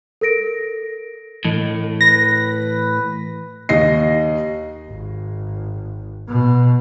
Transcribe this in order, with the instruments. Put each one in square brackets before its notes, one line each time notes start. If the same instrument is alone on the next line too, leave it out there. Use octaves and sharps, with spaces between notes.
[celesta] A4 A#4 A#6 D7
[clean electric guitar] A2 [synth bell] E3
[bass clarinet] B4 [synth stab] A#6
[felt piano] D#2 D#5 A#6 C7
[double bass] G#1
B2